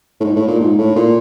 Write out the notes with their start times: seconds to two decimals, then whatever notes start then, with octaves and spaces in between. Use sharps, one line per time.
0.20 A2
0.24 G#2
0.36 A2
0.47 A#2
0.60 G#2
0.78 A2
0.96 A#2